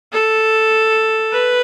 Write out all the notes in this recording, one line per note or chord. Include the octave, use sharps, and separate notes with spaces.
A4
B4